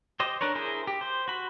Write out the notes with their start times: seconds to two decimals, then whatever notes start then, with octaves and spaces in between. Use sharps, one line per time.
0.20 G4 C5 D#5
0.41 D4 A#4 B4 C#5
0.55 E4 G#4 A#4 C5
0.87 G4
1.01 C5
1.28 F#4 B5